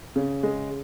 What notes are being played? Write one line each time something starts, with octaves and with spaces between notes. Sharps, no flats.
C#3
G#3